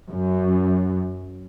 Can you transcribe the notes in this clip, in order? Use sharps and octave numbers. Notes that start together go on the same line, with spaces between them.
F#2